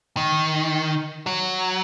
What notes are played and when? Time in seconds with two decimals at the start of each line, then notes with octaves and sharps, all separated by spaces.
0.17 D#3
1.27 F#3